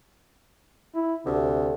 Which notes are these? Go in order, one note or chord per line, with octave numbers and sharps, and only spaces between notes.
E4
D2 C3